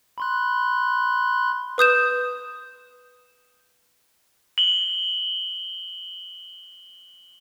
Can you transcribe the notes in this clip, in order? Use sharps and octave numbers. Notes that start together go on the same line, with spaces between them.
B5 C6 F#6
B4 D#6 G6 E7
F#7 G7